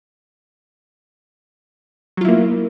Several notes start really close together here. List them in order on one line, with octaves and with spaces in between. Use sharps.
F#3 F4 E4 A#3